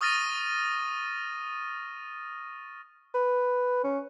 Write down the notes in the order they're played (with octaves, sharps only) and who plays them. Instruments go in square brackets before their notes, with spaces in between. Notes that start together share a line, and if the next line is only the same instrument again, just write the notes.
[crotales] C#6 D#6 F6 A6 A#6 D#7
[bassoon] B4
C#4